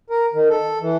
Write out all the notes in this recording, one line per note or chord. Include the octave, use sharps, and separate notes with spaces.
A#4
D#3
A4
E3